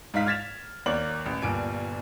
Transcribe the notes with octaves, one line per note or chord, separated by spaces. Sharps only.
G#2 D#4 F5 B6
F6 G#6 A6 B6 E7 F7
D#2 A#3 C#5 D5 F#7
A1
G1 G2 A#2 G#5 D7